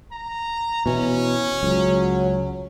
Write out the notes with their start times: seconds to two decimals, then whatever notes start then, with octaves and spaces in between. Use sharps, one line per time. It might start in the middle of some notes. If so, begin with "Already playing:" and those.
0.12 A#5
0.86 B2 E3 C#4
1.63 C#2 F#3